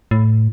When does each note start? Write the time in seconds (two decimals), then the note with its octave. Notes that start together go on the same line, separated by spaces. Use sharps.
0.11 A2